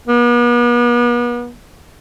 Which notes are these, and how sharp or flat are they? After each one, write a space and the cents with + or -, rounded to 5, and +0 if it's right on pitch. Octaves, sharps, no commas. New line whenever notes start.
B3 -40